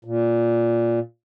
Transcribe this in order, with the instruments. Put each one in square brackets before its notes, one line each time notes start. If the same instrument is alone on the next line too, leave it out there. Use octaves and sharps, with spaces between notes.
[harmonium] A#2